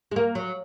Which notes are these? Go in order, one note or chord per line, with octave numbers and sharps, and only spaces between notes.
G#3
A#3
F#3